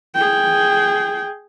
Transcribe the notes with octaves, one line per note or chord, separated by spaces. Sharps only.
G#4 G5